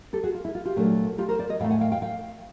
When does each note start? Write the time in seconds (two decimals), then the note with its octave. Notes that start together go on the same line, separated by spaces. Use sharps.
0.13 G4 A4
0.23 F#4 G#4
0.34 F4
0.45 E4
0.55 F4
0.65 F4 G4
0.76 A#2 F#3 A3 D4
1.18 F4 G4
1.29 A#4 C5
1.39 C5 D5
1.49 C#5 D#5
1.60 A2 F#3 A3 F5 G5
1.70 F#5 G#5
1.81 F5 G5
1.92 F5 G5
2.02 F5 G5